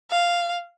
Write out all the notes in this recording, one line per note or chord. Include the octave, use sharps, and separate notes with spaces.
F5